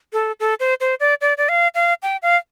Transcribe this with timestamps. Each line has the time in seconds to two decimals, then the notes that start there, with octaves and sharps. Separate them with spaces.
0.13 A4
0.40 A4
0.60 C5
0.80 C5
1.00 D5
1.21 D5
1.38 D5
1.49 F5
1.75 F5
2.03 G5
2.22 F5